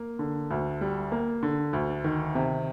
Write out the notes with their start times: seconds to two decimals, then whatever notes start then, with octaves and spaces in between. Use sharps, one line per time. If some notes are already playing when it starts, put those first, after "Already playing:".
Already playing: A#3
0.19 D3
0.51 D2
0.81 G3
1.12 A#3
1.43 D3
1.73 D2
2.04 D#3
2.35 C3